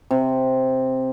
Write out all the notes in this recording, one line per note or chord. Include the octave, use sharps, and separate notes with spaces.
C3